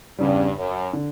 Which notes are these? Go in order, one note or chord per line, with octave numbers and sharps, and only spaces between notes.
E2 G2 C#3 G3
F#2
D3